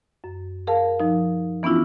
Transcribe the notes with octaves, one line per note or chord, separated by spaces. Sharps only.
F#2
G#4 A#4 F5 A5
F3 D#4
E3 B3 C#4 D4 E4 F4